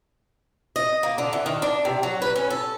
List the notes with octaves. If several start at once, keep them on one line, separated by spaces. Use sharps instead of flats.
D#5
A#3
D3
E3
D#3
D4
C3
F#3
B4
C#4
A4